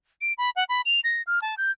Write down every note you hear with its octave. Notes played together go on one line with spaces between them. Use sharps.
D7
B5
F#5
B5
F7
A#6
F6
A5
G6